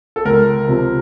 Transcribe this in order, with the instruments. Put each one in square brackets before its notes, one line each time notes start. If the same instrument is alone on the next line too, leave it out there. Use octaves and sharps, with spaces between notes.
[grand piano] A4
C#2 A#4
C3 F3